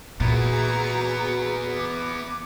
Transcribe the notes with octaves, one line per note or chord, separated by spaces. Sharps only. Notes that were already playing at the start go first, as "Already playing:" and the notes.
A#2 B3 E4 F#4 G#4 A#5
D6